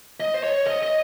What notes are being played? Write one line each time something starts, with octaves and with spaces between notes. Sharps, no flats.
D#5
C5
C#5
D#5
D#5